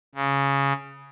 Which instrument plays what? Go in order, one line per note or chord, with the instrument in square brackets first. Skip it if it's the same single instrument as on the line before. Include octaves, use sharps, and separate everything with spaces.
[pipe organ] C#3